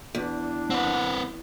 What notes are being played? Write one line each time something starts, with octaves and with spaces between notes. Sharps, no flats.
E2 D4
C4 B4 F#5